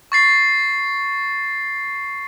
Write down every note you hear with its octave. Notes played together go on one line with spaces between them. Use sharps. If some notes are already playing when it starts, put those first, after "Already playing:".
C#6 A6 C7